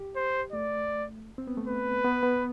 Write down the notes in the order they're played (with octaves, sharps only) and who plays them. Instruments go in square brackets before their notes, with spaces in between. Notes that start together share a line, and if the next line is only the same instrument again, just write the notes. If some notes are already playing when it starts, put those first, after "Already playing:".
Already playing: [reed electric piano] G4
[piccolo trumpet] C5
[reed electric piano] A3 [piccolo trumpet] D5
[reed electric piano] C4
B3
A3
[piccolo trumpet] B4
[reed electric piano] B3
B3